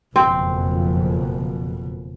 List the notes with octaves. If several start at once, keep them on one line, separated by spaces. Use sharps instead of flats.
F#1 F2 B2 C4